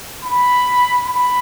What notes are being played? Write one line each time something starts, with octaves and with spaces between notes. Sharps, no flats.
B5
B5